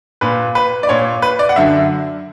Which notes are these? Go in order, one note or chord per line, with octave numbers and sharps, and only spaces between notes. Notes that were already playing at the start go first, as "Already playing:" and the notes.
A#2 B4
B4
D5
A#2 C#5
B4
D5
F#5
F#2 D3 E5